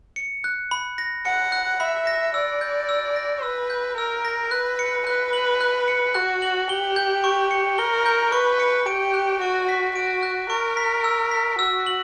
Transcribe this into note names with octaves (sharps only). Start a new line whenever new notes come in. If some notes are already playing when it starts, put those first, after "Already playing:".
C#7
F#6
B5
A#6
F#5 C#7
F#6
E5 B5
A#6
D5 E6
G6
E6
A#6
B4 E6
G6
A#4 E6
A#6
B4 F#6
C#7
B4 F#6
F#7
F#6
C#7
F#4 F#6
F#7
G4 G7
G6
C#6
C#7
A#4 G7
G6
B4 C#6
C#7
G4 D7
F#6
F#4 C#6
B6
F#4 D7
F#6
A#4 C#6
B6
E6
B6
F#4 E6
F#7